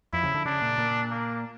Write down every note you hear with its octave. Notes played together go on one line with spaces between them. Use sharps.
F2 E4
C#3
D3
C#3 D4
A#2
A#2
A#3